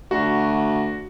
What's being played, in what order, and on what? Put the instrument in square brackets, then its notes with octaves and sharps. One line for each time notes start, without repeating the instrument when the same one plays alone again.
[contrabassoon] D2 [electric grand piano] F#4